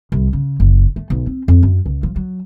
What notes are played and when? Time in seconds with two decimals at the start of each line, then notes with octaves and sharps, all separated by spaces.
0.12 C2
0.33 C#3
0.60 F#1
0.96 A3
1.10 B1
1.26 C4
1.48 F2
1.63 F#2
1.86 C#2
2.03 F3
2.16 F#3